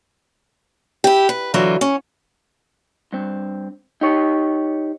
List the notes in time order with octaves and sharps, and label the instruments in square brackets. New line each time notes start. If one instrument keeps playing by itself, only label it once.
[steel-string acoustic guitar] E4 G4
B4
D3 E3 F#3 F4
C#4
[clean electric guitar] G2 C4
D#4 G4 C#5